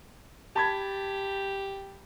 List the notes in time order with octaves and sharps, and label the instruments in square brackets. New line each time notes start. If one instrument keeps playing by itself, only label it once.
[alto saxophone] G4 [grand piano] A5 B5 G#6